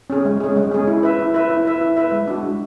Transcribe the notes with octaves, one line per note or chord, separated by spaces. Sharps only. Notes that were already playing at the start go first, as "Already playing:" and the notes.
C#4 G#4
G#3
C#4 G#4
G#3
C#4 G#4
E4
B4 E5
E4
B4 E5
E4
B4 E5
E4
B4 E5
G#3
D4 F#4
G#3